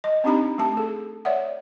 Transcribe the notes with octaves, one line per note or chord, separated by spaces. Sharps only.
D#5
C4 D4 D#4 G4 A#5 B5
A3 G4 A5
G#4 A4
C#5 D5 E5 F#5